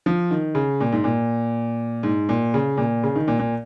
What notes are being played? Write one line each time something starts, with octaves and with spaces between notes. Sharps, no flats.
F3
D#3
C#3
A#2
G#2
A#2
G#2
A#2
C#3
A#2
C#3
D#3
A#2
A#2